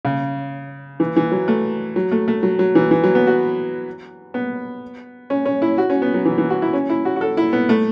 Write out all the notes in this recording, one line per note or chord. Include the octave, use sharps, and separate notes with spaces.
C#3
E3
E3
F#3
A3
F#3
A3
A3
F#3
F#3
E3
E3
F#3
B3
F#4
B3
C#4
C#4
E4
F#4
C#4
B3
F#3
E3
E3
F#4
E4
C#4
E4
F#4
F#4
A4
E4
B3
A3